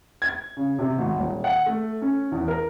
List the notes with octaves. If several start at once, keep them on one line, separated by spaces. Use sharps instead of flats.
G#6
C#3
C3
G#1
D#1
F#5
A3
C#4
E2
A#4